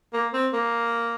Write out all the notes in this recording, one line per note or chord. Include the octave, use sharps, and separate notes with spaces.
A#3
C4
A#3